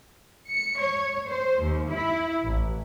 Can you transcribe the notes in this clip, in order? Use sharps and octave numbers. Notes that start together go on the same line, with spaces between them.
C#7
C#5
C5
D#2
E4
A1